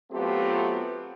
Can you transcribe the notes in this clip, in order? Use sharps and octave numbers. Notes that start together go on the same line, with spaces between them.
F#3 A3 B3 C4 F4 G4